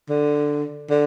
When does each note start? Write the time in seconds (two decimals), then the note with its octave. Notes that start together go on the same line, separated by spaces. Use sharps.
0.09 D3
0.90 D3